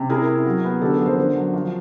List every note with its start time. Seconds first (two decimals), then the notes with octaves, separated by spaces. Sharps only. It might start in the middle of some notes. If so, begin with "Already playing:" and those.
Already playing: C3
0.09 E4 G#4 A#4
0.27 E4
0.46 F#3
0.64 B3
0.81 D3 G4 A4
0.93 G#4 A#4
1.00 F3
1.06 A#4 C5
1.18 D3
1.36 F#3
1.53 F3